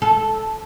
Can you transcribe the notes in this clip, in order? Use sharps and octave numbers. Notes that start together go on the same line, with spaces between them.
A4